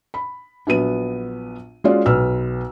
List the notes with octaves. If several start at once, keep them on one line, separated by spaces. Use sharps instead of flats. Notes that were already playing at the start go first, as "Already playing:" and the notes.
B5
A#1 F#3 B3 D#7
G#3 C#4 F4 F#4 D5
B1 B4 E6 F6